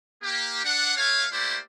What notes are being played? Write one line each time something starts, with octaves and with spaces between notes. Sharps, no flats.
A#3 G4
D4 F#5
A3 C#5 F5
A3 A#3 E4 G4 C5 D5